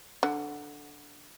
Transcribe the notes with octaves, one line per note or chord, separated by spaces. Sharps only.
D3